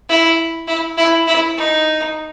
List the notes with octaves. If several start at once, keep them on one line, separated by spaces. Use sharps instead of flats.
E4
E4
E4
E4
D#4